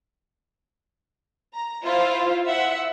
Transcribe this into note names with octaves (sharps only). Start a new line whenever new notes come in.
A#5
E4 F4 C5
E5 F#5